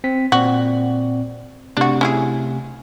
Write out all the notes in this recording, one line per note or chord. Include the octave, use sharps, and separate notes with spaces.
C4 B6
A#2 C4 F#4 D5
C3 A3 D4 F#4
C#4 E4 G#4